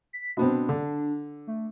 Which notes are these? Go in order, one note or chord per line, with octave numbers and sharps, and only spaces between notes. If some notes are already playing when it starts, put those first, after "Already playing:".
B6
B2 B3 C4 D4
D3
A3